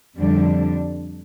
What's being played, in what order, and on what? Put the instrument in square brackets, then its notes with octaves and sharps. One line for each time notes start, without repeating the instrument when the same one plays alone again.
[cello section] F2 D3 G3 D4